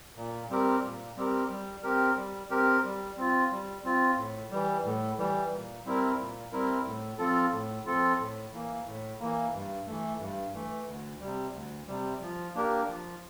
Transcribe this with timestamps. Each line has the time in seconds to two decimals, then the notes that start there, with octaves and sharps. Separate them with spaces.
0.16 A#2
0.49 G3 C4 G4 A#4
0.83 A#2
1.16 G3 C4 G4 A#4
1.50 G3
1.83 C4 G4 A#4
2.16 G3
2.50 C4 G4 A#4
2.84 G3
3.17 C4 F4
3.51 G3
3.84 C4 F4
4.17 A2
4.51 E3 G3
4.85 A2
5.18 E3 G3
5.52 A#2
5.85 G3 C4 E4 A#4
6.18 A#2
6.52 G3 C4 E4 A#4
6.85 A2
7.19 F3 C4 F4 A4
7.53 A2
7.86 F3 C4 F4 A4
8.19 A2
8.53 E3 A#3
8.86 A2
9.20 E3 A#3
9.53 G2
9.87 E3 A3
10.20 G2
10.54 E3 A3
10.87 D2
11.20 C3 G3
11.54 D2
11.87 C3 G3
12.21 F3
12.55 A#3 D4 G4 A#4
12.88 F3